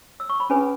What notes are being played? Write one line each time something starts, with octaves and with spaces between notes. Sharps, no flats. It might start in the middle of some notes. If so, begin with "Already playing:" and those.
E6
C#6
B5
C#4 G#4 B4 G#5